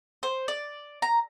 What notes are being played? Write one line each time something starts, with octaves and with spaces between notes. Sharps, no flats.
C5
D5
A#5